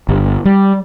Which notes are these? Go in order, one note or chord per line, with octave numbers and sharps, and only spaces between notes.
G1
G3